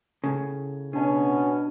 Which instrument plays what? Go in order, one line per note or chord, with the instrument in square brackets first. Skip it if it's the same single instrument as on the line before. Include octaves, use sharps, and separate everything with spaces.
[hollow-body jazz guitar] A2 C#3
[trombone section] B2 [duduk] C#4 [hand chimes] D4 A5